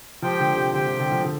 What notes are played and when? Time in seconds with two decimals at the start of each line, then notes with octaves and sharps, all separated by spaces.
0.22 F3 G4 C5 G5
0.40 D3
0.56 C3
0.73 D3 G4 C5 G5
0.86 C3
0.99 D3
1.12 F3
1.24 D3